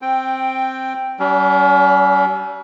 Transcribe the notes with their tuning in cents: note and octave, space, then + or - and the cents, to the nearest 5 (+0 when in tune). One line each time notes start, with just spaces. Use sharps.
C4 +10 G5 +0
G3 -35 C#4 +35